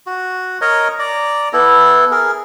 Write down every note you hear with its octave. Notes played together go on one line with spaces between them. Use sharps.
F#4
A#4 C#5 D#5 A#5
D5 A#5
B3 E4 A4
G#4 A#4